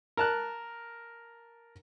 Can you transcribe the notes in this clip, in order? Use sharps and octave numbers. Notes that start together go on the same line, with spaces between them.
A#4 A5 F#6